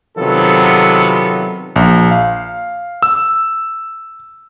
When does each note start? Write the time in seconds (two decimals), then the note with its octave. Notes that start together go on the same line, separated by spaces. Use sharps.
0.18 C3 D#3 F#3 B3 F4 A4
1.76 A#1
2.11 F5
3.03 E6